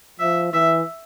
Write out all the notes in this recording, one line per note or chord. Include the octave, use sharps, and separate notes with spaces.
F3 E5
E3 E5